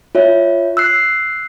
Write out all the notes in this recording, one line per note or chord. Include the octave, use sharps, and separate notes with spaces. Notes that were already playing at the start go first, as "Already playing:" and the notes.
F4 C#5 E5
E6 F#6 C7